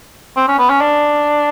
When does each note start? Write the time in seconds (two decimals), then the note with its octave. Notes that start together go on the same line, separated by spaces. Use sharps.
0.37 C4
0.48 C#4
0.59 B3
0.70 C#4
0.81 D4